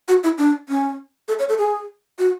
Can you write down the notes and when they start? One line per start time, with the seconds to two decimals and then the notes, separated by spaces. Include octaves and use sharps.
0.08 F#4
0.24 E4
0.38 D4
0.69 C#4
1.28 A4
1.39 C#5
1.49 A4
1.58 G#4
2.19 F#4